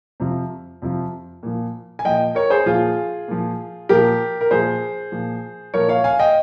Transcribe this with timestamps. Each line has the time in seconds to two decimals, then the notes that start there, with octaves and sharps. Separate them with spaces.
0.20 F2 C3 F3
0.82 F2 C3 F3
1.43 A#2 F3
1.99 G#5
2.05 A#2 F3 D#5 G5
2.35 A#4 C#5
2.50 G#4 C5
2.66 A#2 F3 F4 G#4
3.28 A#2 F3
3.89 A#2 F3 G4 A#4
4.41 A#4
4.51 A#2 F3 G#4 C5
5.12 A#2 F3
5.74 A#2 F3 A#4 C#5
5.89 C#5 F5
6.04 F5 G#5
6.19 D#5 G5